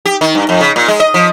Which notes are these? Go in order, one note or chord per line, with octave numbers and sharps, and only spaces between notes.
G4
D#3
G2
F2
C#3
A#2
G#3
D#5
F3